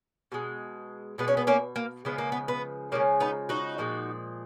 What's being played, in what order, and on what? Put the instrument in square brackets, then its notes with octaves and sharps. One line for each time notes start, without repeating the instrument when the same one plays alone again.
[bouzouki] B2 G#3
B2 G#3 B3
C#4
B3
A#3 C#4
A#3
C#3 F3 G#3 B3
A#3
B3
B3
C#3 F3 G#3 A#3 C#4
B3 D#4
D#4 F#4
A#2 F3 G#3